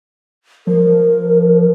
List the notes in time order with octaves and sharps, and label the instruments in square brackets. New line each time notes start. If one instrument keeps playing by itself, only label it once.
[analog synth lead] F3 [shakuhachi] A#4